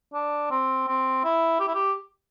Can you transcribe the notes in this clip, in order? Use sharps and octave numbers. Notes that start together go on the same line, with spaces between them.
D4
C4
C4
E4
G4
E4
G4